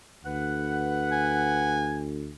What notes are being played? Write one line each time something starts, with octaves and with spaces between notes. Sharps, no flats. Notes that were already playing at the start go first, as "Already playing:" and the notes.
D2 B4 F#5
G#5